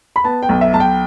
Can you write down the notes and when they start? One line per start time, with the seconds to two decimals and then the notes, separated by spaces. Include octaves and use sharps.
0.16 B5
0.24 B3 A5
0.43 G5
0.49 B1
0.61 E5
0.74 B1 A5
0.80 G5